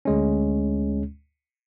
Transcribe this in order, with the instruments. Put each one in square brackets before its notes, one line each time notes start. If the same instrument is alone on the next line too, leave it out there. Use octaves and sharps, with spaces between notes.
[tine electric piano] D2 G#3 C#4